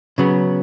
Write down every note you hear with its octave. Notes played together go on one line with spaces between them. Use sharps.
C#3 F#3 B3